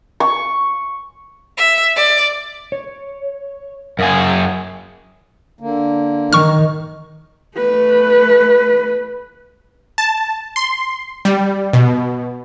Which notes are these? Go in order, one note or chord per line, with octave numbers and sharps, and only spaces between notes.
C#6
E5
D5
C#5
F#2 G#4 A#4 F5 F#5
D3 A#3
D#3 C#6 F6
A3 B4
A5
C6
G3
B2